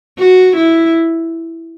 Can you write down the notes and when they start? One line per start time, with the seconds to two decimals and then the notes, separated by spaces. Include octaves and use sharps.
0.19 F#4
0.56 E4